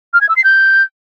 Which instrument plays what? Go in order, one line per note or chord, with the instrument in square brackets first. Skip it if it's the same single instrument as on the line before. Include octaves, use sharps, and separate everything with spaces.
[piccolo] F6
G#6
E6
C7
G6